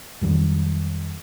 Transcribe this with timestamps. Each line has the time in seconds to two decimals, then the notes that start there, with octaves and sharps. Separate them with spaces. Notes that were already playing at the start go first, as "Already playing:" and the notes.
0.21 F2 D#3 F#3 G3